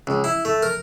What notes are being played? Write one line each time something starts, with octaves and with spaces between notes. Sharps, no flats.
C#2
E4
A3
A#4